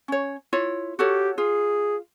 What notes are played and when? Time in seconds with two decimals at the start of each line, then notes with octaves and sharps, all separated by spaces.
0.08 C#4 C#5
0.53 E4 F4 C#5
0.99 F#4 G4 A4 C#5
1.38 F4 G#4